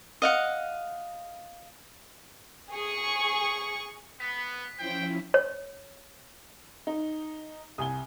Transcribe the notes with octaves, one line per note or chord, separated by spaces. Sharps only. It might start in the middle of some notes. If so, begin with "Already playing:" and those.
D#5 F5 F#5
G#4 C#6
B3 B6
F3 C#4 E4 C5 G5
C#5
D#4
C2 G#5 D#6 G7